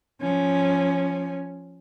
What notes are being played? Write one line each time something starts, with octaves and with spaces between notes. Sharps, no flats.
F3 C#4